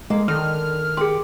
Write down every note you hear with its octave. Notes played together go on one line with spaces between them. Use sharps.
G#3 A#3
D3 D#3 F6
G4 G#4 C6